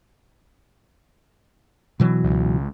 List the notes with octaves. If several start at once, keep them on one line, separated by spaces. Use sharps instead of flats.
B2 E3 F#3
C#2